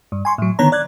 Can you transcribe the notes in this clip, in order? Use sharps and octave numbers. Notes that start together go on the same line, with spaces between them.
G2
G#5 C6 C#6
A2 F#3
D3 D#3 B3 C#5 A#5
D5 F#6 G#6